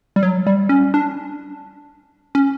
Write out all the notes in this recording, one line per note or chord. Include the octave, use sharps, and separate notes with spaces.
G3
F#3
G3
C#4
D4
C#4